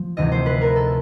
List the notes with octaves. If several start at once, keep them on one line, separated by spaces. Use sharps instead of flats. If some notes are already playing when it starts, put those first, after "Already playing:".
Already playing: F3
D2 C3 E3 D#5
C5
B4
A#4
A4